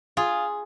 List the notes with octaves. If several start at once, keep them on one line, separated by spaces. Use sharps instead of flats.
F4 G#4